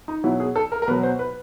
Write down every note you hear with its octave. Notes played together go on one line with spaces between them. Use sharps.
D#4
B2 F#3 E4
G#4
A4
A#4
A#4
B2 F#3 B4
C5
B4